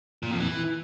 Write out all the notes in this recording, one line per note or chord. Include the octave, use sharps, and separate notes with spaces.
A#2
F2
E3